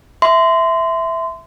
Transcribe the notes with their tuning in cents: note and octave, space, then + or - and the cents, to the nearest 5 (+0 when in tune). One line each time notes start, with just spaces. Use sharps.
E5 +0 C6 -25